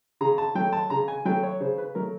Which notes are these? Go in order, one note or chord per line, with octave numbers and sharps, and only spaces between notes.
C#3 A#5
A5
F#3 A3 G5
A5
C#3 A#5
G#5
F#3 A3 G5
C#5
C#3 C5
B4
F#3 A3 A#4